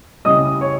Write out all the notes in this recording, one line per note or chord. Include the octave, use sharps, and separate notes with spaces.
C#3 G3 C#4 E4 D#5 D#6
C#5 C#6